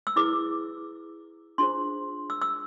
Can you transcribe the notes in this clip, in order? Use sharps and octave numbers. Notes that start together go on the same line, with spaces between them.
E6
E4 G#4 B4 D6
D4 F4 G#4 C5 C6
E6
E6